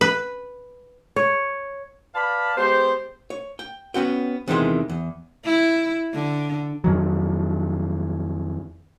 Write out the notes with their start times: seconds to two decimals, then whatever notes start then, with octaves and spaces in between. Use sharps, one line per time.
0.01 B4
1.16 C#5
2.15 B4 D5 F5 A5 B5
2.57 G#3 B3 G4 C5
3.30 C#5
3.59 G5
3.94 B3 C#4 F#4 G5
4.48 E2 C3 D#3 E3 G#3 C6
4.90 E2
5.45 E4
6.14 D3
6.84 F2 D#3 F#3